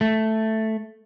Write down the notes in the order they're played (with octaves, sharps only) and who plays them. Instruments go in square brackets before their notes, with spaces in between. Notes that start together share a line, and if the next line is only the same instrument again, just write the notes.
[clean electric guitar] A3